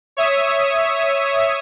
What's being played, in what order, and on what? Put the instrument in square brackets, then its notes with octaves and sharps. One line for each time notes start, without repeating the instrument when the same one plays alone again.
[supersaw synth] C#5 E5 D#6